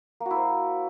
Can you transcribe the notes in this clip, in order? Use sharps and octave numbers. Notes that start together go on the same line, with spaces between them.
A#3
F#4
E4
C5